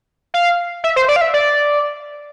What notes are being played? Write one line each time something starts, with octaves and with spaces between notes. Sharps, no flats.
F5
E5
C5
D5
F5
E5
D5